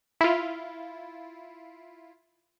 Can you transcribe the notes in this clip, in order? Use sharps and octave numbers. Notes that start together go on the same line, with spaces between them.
E4 F4